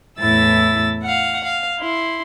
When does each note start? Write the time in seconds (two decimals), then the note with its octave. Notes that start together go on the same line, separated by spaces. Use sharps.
0.19 E2 A2 E4 E6 A6
1.03 F5 F#5
1.43 F5
1.78 E4 C6